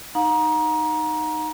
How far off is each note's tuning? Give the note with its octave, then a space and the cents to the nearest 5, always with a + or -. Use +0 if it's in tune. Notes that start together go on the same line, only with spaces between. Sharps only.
D#4 -10 F5 +45 A#5 +25